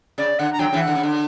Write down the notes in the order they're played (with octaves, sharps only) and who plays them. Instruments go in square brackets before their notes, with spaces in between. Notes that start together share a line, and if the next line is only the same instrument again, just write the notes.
[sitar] C#3 [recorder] D5
[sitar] D3 [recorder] F#5
[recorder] A#5
[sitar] D3 F#3 [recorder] G5
[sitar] C#3 E3
[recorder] F#5
[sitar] D3
C#3
D3